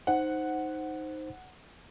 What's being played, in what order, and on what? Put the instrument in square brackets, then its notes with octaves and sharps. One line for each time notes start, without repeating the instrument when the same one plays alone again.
[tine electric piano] D#4 C5 [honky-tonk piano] F#5